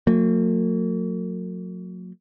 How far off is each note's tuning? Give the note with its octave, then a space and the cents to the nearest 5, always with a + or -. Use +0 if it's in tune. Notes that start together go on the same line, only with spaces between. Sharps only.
F#3 -30 A#3 -45